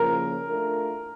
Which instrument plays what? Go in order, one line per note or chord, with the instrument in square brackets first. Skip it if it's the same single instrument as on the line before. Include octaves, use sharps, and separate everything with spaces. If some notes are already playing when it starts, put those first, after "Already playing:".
Already playing: [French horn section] C#3 F3 A#3 [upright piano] A#4
[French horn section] A3 D4 F4 A#4